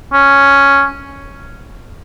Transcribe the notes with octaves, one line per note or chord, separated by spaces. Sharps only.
C#4